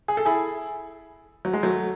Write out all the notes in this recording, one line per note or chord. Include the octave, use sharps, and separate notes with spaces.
G#4
A4
E4 G#4
F#3
G#3
F#3 A3